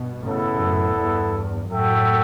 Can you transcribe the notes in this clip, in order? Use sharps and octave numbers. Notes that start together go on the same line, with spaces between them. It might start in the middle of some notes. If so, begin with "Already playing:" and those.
Already playing: G2 B2
A2 C#3 B3 E4 A4
F#2 A2
E2 G2
F#2 A2 F#4 A4 E5 G5